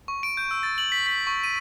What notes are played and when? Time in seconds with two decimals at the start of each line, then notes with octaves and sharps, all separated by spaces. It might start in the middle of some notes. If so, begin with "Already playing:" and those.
0.08 C#6
0.23 D7
0.37 G6
0.51 E6
0.63 A6
0.78 F#7
0.92 B6
1.07 B6
1.27 C#6
1.43 D#7